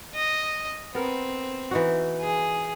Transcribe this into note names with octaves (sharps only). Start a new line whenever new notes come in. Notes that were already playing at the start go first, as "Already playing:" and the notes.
D#5
B3 C4 A#4
E3 D#4 F#4
G#4